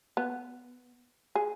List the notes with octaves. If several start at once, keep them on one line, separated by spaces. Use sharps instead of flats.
B3
G#4